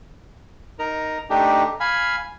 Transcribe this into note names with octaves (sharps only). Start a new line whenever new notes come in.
D#4 A#4 A#5
A3 D4 D#4 G4
F5 G#5 B5